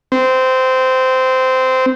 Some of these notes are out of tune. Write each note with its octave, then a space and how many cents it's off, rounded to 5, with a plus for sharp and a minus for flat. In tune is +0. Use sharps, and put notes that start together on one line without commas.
C4 -15